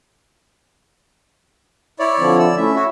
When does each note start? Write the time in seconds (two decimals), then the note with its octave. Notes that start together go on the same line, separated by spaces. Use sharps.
1.99 E4 C#5 D5
2.19 D3 F3 C4
2.39 D5 E6
2.57 A3 C#4 E4 E5
2.76 F#4 C#5 E5